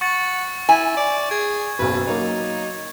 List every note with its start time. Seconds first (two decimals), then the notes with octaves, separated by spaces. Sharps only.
0.01 F#5 C#6 A6
0.69 E4 G#5
0.97 D5
1.31 G#4 G#6
1.79 F#1 B1 B4
2.07 F#3 A#3 D#4